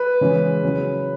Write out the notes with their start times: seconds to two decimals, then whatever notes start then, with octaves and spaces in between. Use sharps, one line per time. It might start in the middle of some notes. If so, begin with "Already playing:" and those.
Already playing: B4
0.21 C#3 E3 G#3
0.64 C#3 F#3